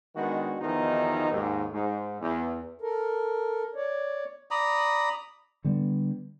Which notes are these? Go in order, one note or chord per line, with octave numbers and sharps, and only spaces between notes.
D#3 G#3 B3 D4 F#4
E2 B2 D#3 F3 D#4
D#2 G#2
G#2
E2
A4 A#4
C#5 D5
D5 A#5 B5 D#6
D3 G3 B3